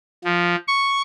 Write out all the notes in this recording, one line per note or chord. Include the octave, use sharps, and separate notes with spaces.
F3
C#6